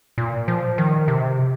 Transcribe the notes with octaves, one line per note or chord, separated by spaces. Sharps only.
A#2
F3
D#3
C3